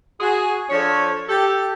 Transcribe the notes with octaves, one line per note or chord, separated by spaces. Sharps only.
F#4 G#4
F3 D4 A4 C#5
G4 A4